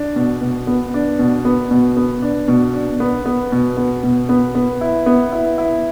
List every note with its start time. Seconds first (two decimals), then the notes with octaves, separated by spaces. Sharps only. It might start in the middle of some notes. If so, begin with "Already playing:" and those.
Already playing: D4
0.16 B2
0.42 B2
0.67 B3
0.94 D4
1.19 B2
1.45 B3
1.71 B2
1.97 B3
2.22 D4
2.48 B2
2.74 D4
3.00 B3
3.26 B3
3.52 B2
3.77 B3
4.03 B2
4.29 B3
4.55 B3
4.81 E4
5.06 B3
5.33 E4
5.58 E4